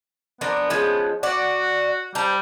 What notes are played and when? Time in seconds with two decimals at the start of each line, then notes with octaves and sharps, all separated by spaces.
0.41 F3 B3 D4 A#4
0.70 F3 G#3 C#4
1.23 F#4 D5 F#5
2.15 G3 C5 A5 A#5